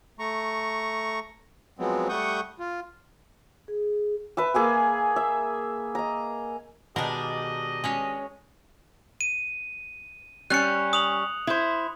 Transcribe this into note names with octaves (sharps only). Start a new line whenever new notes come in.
A3 A#5 C#6
F3 F#3 G#3 B3 C4
G3 A3 F#5 C#6 D#6 G6
F4
G#4
B4 E5 A5
A#3 G#4 E5 G#5
E5
D#5 A#5
B2 D#3 G#3 D4 G4 A#4 D#5
G#3 C#4 C#5
D#7
G3 C#4 F#6 C#7
D#6 F7 F#7
E4 C5